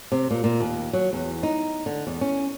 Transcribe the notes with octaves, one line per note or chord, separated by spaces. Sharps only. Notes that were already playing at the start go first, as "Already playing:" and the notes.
C3
A#2
A#2
D#2
F#3
E2
D#4
D3
E2
C#4